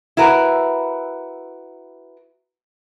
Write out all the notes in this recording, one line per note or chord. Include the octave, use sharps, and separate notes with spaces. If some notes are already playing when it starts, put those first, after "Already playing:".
E4 F#4 A#4 B4